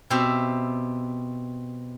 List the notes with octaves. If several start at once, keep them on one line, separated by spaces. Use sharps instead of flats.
B2 C4 G4 E5